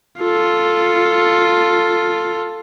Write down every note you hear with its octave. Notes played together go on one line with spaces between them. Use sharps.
F4 A4